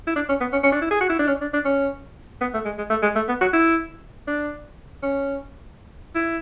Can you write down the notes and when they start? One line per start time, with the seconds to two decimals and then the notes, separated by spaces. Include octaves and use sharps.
0.07 E4
0.16 D4
0.29 C#4
0.41 B3
0.53 C#4
0.63 C#4
0.72 D4
0.81 E4
0.91 G#4
1.01 F#4
1.10 E4
1.19 D4
1.28 C#4
1.41 D4
1.54 D4
1.65 C#4
2.41 B3
2.54 A3
2.65 G#3
2.78 G#3
2.90 A3
3.03 G#3
3.16 A3
3.28 B3
3.41 F#4
3.53 E4
4.28 D4
5.03 C#4
6.15 E4